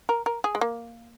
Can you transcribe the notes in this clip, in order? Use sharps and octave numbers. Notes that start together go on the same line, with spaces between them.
A#4
A#4
G#4
G#3
A#3